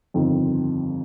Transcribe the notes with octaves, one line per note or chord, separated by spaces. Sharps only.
G1 F2 D#3 C4